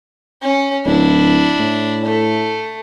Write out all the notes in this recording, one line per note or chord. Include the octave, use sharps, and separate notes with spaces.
C#4
D1 D4 E4
A2
A3